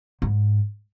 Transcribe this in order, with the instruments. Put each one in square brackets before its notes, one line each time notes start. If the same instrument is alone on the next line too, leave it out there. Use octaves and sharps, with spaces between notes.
[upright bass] G#2